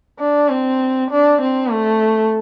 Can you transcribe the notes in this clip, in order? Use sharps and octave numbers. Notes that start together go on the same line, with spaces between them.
D4
C4
D4
C4
A3